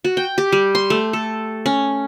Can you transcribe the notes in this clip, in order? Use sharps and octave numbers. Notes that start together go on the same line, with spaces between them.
F#4
G5
G4
G3
C6
A3
A4
C#4